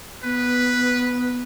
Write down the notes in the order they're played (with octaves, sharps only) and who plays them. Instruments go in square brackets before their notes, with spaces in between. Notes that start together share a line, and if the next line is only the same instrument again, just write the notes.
[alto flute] B3 [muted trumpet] B4